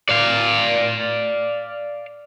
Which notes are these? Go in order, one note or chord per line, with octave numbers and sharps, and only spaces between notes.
D5 F5